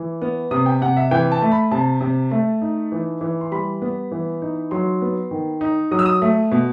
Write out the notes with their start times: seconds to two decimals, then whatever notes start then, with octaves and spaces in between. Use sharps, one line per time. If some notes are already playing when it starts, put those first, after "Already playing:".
Already playing: E3
0.22 B3
0.51 C3 D#6
0.66 G5
0.82 C3 F#5
0.97 E5
1.11 E3 G5
1.32 A5
1.42 A3
1.52 B5
1.71 C3 A5
2.01 C3
2.31 A3
2.62 D#4
2.92 E3
3.21 E3
3.41 C6
3.51 G3 B5
3.82 B3
4.11 E3
4.42 D#4
4.71 F#3 C6
5.01 B3
5.31 D#3
5.61 D#4
5.91 F#3 D#6
5.99 E6
6.06 D#6
6.22 A3
6.52 B2